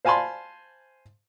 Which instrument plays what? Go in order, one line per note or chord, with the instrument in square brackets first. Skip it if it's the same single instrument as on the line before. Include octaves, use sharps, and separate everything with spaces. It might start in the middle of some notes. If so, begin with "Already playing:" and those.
[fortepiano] C5 F5 G#5 A5 B5 C6